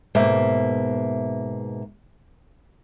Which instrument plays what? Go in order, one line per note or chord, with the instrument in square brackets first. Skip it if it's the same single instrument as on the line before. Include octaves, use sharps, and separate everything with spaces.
[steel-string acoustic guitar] G#2 B2 A#3 E5